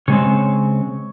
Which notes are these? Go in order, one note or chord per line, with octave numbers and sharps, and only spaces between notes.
C#3 G#3 C4 C#5